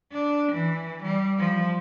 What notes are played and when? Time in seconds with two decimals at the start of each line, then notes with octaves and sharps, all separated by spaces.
0.12 D4
0.52 E3
1.03 G3
1.39 F3